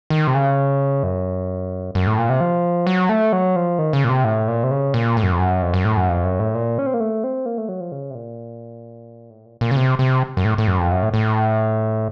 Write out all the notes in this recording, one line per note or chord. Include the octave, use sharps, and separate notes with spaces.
D#3
C3
C#3
F#2
F#2
A2
A#2
C3
F3
F#3
A3
F#3
F3
D#3
C#3
A#2
C3
A2
A#2
C3
C#3
A#2
A2
F#2
F2
F#2
F2
F#2
A2
F#2
F2
F#2
A2
A#2
C#4
C4
A#3
A3
C4
A#3
A3
F#3
F3
C#3
C3
A#2
A2
A#2
A#2
C#3
C3
C3
F#2
A2
A2
F#2
F2
F#2
A2
A2